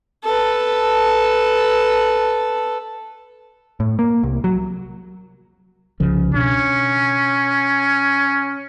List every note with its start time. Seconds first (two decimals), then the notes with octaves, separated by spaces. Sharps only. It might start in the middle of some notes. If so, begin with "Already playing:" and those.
0.24 A4 B4
3.80 A2
3.99 A#3
4.23 C2
4.44 F#3
6.00 C2 C#3 F3
6.34 B2 C#4 D4